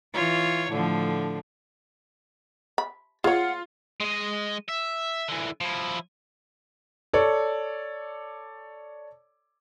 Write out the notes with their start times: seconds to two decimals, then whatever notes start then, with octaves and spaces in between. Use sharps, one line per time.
0.14 E3 F4 C#5
0.70 A2 D3 F3
2.78 B5
3.24 F4 G#4 C#5 F#5
4.00 G#3 D#5
4.68 E5
5.28 D3 E3
5.61 F3 E4
7.13 A4 C#5 D5